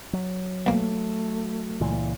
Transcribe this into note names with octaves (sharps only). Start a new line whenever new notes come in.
F#3
B1 A3 A#3
C#2 A#2 E3